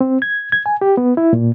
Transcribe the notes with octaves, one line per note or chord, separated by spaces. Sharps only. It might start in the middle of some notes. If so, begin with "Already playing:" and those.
C4
G#6
G#6
G#5
G4
B3
E4
A#2